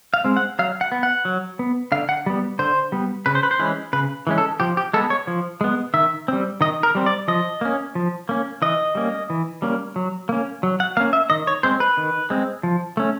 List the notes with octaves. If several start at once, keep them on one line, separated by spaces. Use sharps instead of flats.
F5
G#3 C4
F#5
F#3 F5
F#5
B3
F#5
F#3
B3
D3 F5
F#5
G3 B3
D3 C5
G3 B3
C#3 B4
C5
B4
C5
E3 G#3 C#4 B4
C#3 B4
E3 G#3 C#4
A4
F3 G4
G4
G#3 B3 A4
C#5
F3
G#3 B3
D#3 E5
G3 C4
D#3 D#5
A#4
G3 C4
D5
F3 D#5
A#3 C#4
F3
A#3 C#4
E3 D#5
G3 A#3 C#4
E3
G3 A#3 C#4
F#3
A#3 C#4
F#3
F#5
A#3 C#4 F5
E5
D#3 D#5
C#5
G#3 C4 C5
B4
D#3
G#3 C4
F3
A3 C#4